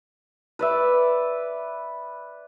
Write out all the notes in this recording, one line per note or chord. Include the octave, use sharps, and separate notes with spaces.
B4 D5 E5